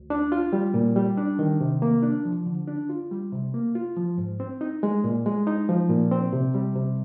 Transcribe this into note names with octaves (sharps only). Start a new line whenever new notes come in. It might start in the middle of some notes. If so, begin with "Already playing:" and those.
Already playing: D2
D4
F4
G3
A#2
G3
D4
D#3
C3
A#3
D4
F3
D3
D4
F4
G3
C3
A#3
F4
F3
G#2
C4
D#4
G#3
A#2
G#3
D#4
F3
A#2
C4
C3
G3
C3